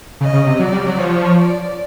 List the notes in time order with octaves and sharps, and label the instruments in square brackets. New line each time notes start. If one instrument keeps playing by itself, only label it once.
[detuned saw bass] C#3 [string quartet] D#5
[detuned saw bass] C#3
C3
[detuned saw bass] F#3 [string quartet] D5
[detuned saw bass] G3
F#3
[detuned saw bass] F3 [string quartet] C#5
[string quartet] D5